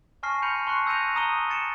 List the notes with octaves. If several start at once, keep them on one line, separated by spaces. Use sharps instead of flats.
G#5 A5 C#6 F6 A#6 C7
B5 C6 G6 C#7 D#7 F7
A5 C6 C#6 F#6 C7
E6 G6 A#6 C#7 D#7 F7
A#5 D#6 E6 D#7 G7
A6 C#7 E7